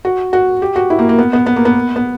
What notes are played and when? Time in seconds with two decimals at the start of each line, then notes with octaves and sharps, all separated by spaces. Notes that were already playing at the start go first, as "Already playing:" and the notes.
0.05 F#4
0.33 F#4
0.62 G4
0.76 F#4
0.90 E4
0.99 A#3
1.09 A#3
1.19 B3
1.33 B3
1.46 B3
1.56 A#3
1.65 B3
1.96 B3